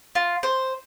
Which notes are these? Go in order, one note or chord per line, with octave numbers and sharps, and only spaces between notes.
F4
C5